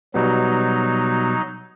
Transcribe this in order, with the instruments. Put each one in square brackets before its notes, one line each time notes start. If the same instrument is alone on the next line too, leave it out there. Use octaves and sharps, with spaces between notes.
[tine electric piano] B2 G3 B3 [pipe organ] F#3 D#4